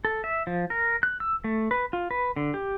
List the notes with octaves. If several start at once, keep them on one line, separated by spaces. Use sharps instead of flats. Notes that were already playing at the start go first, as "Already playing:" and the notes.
A4
E5
F3
A#4
F#6
E6
A3
B4
F4
B4
D3
G4